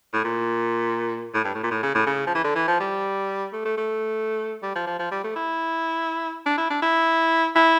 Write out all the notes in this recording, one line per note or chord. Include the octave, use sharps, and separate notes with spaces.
A2
A#2
A2
G2
A2
A#2
A2
C#3
A2
C#3
F3
E3
D3
E3
F3
G3
A3
A3
A3
G3
F3
F3
F3
G3
A3
E4
D4
E4
D4
E4
E4